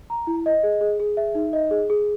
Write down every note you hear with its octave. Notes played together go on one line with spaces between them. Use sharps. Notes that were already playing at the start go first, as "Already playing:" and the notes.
A#5
E4
D#5
G#4
G#4
G#4
E5
D#4
D#5
G#4
G#4